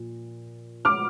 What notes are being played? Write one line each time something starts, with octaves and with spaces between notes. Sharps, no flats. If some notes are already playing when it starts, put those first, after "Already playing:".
Already playing: A#2 F3
D6 F6